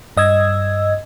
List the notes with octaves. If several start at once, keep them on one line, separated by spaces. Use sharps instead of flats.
G2 D#5 E6 G#6